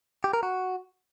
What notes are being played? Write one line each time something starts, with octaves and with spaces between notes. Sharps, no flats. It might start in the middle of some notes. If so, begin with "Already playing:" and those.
G4
A#4
F#4